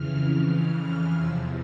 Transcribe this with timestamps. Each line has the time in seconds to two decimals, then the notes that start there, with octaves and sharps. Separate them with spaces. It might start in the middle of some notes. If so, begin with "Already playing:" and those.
Already playing: F2 C#3 E3 F6
1.17 E2 C3 F3 E6